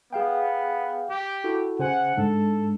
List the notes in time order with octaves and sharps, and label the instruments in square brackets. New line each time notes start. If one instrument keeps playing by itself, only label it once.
[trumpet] B3 [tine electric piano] G#4 F5 G5
[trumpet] G4
[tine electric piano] E4 F#4 A4
[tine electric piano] C#3 C5 G#5 [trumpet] F#5
[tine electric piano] G#2 G#3 D4 [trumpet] A4